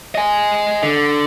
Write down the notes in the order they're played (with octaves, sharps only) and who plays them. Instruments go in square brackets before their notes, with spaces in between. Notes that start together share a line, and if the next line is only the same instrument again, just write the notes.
[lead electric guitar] D#5 G#5
D3